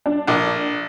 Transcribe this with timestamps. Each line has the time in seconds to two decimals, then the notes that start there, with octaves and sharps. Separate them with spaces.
0.06 D4
0.27 A#1